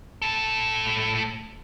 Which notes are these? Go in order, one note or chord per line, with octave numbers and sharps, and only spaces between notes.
A2 A4